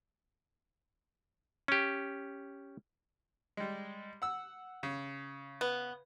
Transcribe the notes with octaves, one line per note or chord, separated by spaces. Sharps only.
C#4 G4
G3 G#3
F#5 E6
C#3
B3